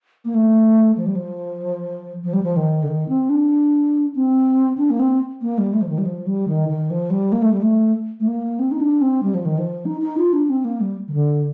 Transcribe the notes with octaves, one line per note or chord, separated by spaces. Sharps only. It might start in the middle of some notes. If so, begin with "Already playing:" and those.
A#3
A3
F3
G3
F3
F3
G3
F3
D#3
D3
D#3
C4
D4
C4
D4
A#3
C4
A#3
G3
A3
F3
D#3
G3
F3
G3
D#3
D#3
F3
G3
A#3
A3
G3
A3
A3
A#3
C4
D#4
D4
C4
G3
F3
D#3
F3
D#4
D#4
F4
D4
C4
A#3
G3
D#3
D3